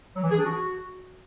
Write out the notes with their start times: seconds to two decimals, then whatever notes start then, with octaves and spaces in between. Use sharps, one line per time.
0.16 F#3
0.24 E3
0.31 G#4
0.38 D4
0.46 F#4